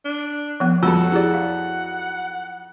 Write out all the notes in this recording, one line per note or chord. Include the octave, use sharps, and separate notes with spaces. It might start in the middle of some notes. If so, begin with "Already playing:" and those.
D4
F3 B3
F2 F#3 F4 A4 F#5 A#5 E6
E4 G4 G#4 D5
F5